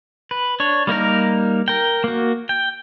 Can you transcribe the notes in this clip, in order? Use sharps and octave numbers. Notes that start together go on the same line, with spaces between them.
B4
D4 C#5
G3 A#3 D#4 A#4
A#4 G5
A#3 F#4
G5